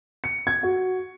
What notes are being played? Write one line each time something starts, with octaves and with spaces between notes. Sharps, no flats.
C#7
G#6
F#4